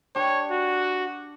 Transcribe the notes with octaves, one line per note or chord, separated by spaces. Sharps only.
D4 G4 C#5
F#4